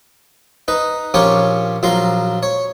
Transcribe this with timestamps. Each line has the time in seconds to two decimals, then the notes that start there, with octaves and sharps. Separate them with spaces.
0.68 D#4 B4 A#5
1.14 A#1 C#4 F4 G4 A#4 C#5
1.83 A#1 F#3 F4 A#5 C6
2.43 C#5